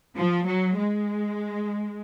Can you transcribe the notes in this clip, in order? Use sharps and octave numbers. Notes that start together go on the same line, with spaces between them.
F3
F#3
G#3